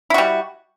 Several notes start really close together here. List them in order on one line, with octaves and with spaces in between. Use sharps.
E4 F#4 G3